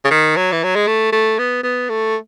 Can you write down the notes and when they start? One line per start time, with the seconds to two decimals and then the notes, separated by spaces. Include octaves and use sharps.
0.05 C#3
0.11 D#3
0.36 F#3
0.52 E3
0.63 F#3
0.75 G#3
0.87 A3
1.12 A3
1.38 B3
1.63 B3
1.89 A3